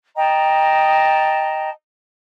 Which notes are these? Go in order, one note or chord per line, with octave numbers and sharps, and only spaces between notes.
D#5 G5 A5 A#5